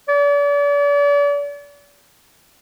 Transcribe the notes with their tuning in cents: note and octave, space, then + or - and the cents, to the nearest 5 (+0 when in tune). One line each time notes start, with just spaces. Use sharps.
D5 -40